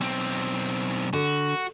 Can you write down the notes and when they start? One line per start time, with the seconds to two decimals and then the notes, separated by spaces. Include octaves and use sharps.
0.01 B1 C4
1.13 D3 F#4